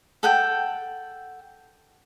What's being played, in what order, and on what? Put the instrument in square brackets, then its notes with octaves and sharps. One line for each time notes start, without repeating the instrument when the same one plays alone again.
[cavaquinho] A4 F#5 G5